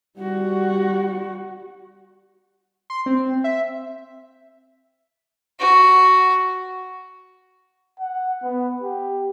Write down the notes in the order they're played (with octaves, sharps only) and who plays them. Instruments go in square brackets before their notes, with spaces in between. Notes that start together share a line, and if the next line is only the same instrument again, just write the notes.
[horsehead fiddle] G3 F#4
[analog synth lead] C6
C4
E5
[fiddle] F#4
[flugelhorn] F#5
B3
G4